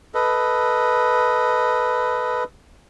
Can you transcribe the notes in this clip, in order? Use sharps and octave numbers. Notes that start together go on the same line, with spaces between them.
A4 B4 D#5